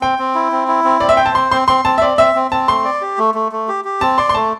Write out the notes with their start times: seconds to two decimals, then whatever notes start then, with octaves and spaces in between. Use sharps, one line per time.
0.01 C4 G5
0.19 C4
0.35 E4
0.52 C4
0.68 E4
0.84 C4
1.00 C4 D5
1.09 E5
1.17 C5 G5
1.26 A5
1.35 C4 C6
1.52 C4 C6
1.68 C4 C6
1.85 C4 A5
1.98 E5
2.02 C4 D5
2.18 C4 E5
2.35 C4
2.51 C4 A5
2.68 A3 C6
2.85 D5
3.01 G4
3.18 A3
3.35 A3
3.52 A3
3.68 G4
3.85 G4
4.01 C4 A5
4.18 D5 C6
4.29 C6
4.35 A3 A5